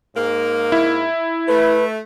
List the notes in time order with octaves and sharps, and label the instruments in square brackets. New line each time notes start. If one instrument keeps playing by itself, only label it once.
[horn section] G#2 A#3
[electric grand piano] E4
[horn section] A3 [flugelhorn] B4